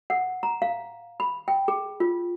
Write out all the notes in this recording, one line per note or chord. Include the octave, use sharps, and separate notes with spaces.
F#5
A#5
F5
B5
G5
G#4
F4